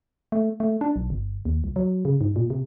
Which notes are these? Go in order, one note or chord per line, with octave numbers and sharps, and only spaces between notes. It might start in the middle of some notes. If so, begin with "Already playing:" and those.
A3
A3
D4
B1
G1
D#2
C2
F#3
C#3
G#2
A#2
C3